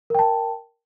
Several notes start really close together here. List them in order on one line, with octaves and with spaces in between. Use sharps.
A#4 G5 A5